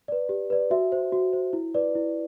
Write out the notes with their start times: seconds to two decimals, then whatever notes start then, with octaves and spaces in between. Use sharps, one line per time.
0.08 B4 D5
0.29 G4
0.50 B4 D5
0.71 F#4 E5
0.92 C5
1.12 F#4
1.33 C5
1.53 E4
1.74 B4 D5
1.95 E4